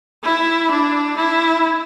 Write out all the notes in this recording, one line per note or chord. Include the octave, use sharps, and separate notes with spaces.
E4
D4
E4